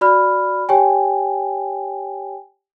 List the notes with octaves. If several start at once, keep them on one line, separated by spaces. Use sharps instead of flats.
F#4 D5 B5 F6
G4 C#5 G5 G#5